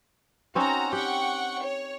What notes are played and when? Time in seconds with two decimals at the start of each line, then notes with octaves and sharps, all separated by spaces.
0.55 C4 C#4 D#4 F#4 A#5
0.93 G4 F#5 G5 C#6
1.62 C#5